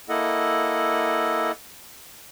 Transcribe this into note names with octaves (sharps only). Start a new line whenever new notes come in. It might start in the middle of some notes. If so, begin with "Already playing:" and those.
A#3 E4 A4 D#5 F#5